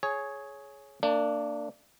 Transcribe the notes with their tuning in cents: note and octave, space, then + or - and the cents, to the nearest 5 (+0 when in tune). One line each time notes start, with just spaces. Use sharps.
G#4 +15 C#5 +0
A#3 -35 D4 +0